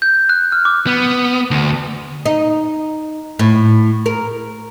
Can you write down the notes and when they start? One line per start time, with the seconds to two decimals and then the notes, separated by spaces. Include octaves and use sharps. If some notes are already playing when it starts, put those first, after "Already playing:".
0.02 G6
0.29 F#6
0.52 F6
0.65 D6
0.87 B3
1.51 D2
2.26 D#4
3.39 A2
4.06 A#4